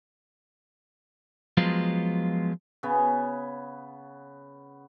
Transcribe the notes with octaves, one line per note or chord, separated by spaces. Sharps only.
F3 F#3 G#3 B3 F4
C#3 B3